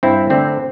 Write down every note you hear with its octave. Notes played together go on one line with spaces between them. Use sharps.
G2 C4 E4
D3 A3 C4